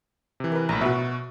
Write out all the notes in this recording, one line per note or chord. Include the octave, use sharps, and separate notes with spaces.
C3 E3
A#4 B4
A#1 A2 A#5 B5
B2 F#4 B4 E5